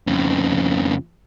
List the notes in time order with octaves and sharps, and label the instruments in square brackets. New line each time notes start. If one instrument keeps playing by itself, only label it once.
[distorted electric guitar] F2 C#3